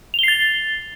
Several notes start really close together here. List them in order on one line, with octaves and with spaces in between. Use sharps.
F7 G7 C7 A6